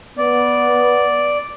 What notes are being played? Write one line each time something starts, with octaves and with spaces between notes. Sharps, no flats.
B3 D5